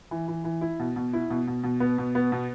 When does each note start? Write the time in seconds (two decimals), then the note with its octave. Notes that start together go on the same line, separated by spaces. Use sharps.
0.11 E3
0.28 E3
0.44 E3
0.61 E4
0.79 B2
0.96 B2
1.13 E4
1.30 B2
1.47 B2
1.63 B2
1.80 B3
1.98 B2
2.15 B3
2.32 B2